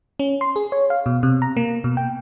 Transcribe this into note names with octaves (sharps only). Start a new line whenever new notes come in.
C#4
C6
G#4
C#5
F5
B2
C3
A#5
A#3
B2
G5